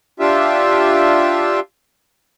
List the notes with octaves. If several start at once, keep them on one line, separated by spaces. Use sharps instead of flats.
D4 F4 G4 E5